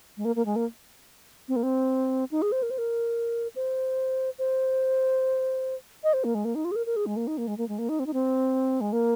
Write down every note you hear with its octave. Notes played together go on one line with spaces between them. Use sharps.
G#3
A#3
A#3
G#3
A#3
C4
A#3
C4
D#4
G#4
C5
A#4
C5
A#4
C5
C5
D#5
C5
A#3
G#3
A#3
D#4
F4
G#4
A#4
A#4
G#4
G#3
A#3
D#4
A#3
G#3
A#3
G#3
A#3
D#4
C4
D#4
C4
G#3
A#3